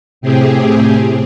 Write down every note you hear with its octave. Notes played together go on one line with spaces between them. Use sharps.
A2 C3 C4 G4 G#4